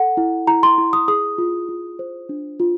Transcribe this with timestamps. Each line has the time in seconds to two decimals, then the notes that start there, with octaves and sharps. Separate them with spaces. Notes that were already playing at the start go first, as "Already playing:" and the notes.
Already playing: A4 F#5
0.17 E4
0.47 E4 A#5
0.63 C6
0.78 E4
0.93 D#6
1.08 G#4 D#6
1.38 F4
1.69 F4
1.99 C5
2.29 D4
2.60 F4